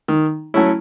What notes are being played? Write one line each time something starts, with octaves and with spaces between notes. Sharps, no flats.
D#3
F#3 A3 C#4 E4